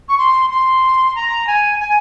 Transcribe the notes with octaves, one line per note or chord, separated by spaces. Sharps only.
C#6
C6
C6
A#5
G#5
G#5